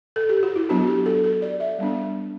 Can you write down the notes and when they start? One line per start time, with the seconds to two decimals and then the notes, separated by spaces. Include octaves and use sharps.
0.16 A4
0.29 G4
0.43 F#4
0.56 E4
0.69 F#3 B3 D4 F#4
0.87 G4
1.06 A4
1.24 A4
1.42 D5
1.60 E5
1.79 G3 B3 D4